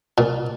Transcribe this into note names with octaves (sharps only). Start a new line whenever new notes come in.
A#2